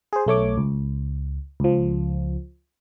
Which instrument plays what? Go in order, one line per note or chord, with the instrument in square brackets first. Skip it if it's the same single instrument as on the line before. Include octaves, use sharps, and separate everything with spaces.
[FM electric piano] G#4 C5
B1 A3 C#5 D6
C#2
C#2 F3